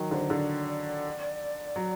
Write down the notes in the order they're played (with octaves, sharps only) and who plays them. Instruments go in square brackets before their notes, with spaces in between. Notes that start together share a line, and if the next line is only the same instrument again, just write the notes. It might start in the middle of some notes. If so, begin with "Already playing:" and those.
Already playing: [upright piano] D#3 F#3
[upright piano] D3 [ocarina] C5
[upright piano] D3 [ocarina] D5
[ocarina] D5
[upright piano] F#3